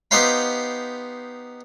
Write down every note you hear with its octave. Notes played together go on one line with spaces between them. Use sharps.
B3 D#4 G4 C5 F5 B5